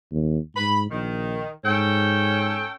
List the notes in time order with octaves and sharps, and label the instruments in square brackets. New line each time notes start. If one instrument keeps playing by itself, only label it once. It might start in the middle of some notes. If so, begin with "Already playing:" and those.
[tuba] D#2
[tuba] G#2 [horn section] B5
[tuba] A#1 [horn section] D#3
[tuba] G#2 [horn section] C#4 A4 G5